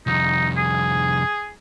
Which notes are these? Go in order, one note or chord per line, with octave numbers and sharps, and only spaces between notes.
C2 F2 D#4
G#4